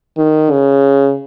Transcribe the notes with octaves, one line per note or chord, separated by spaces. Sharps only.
D#3
C#3